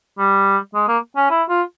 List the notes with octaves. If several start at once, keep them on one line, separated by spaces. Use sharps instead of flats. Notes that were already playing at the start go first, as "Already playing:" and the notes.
G3
G#3
A#3
C#4
E4
F4